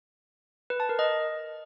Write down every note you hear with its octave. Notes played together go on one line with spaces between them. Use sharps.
B4
A5
A#4
D#5